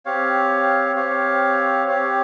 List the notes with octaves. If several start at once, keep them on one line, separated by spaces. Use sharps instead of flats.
C4 G4 C#5 F5
C4 G4 C#5 F5
C4 G4 C#5 F5